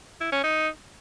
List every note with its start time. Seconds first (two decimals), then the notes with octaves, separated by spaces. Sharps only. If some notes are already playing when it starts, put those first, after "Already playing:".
0.21 E4
0.32 C#4
0.44 D#4